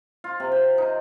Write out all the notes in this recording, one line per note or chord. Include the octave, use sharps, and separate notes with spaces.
F4
C3
G5
D#4